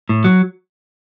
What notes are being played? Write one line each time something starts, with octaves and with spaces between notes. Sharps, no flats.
A2
F#3